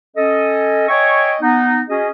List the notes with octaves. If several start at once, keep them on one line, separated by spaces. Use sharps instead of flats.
C#4 A4 D#5
C#5 D#5 E5 G5 G#5 C#6
B3 D#4
C#4 F#4 G#4 D#5